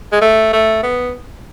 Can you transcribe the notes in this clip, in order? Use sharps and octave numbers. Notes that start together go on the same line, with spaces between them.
G#3
A3
A3
B3